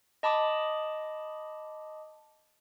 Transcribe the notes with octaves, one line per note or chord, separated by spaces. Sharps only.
D#5 A5 B5 D6 D#6